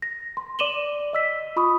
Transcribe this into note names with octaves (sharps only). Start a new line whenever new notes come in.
A#6
C6
D5 D6 D#7 E7 F#7 G7
D#5 E6 B6
F4 B5 C#6 D#6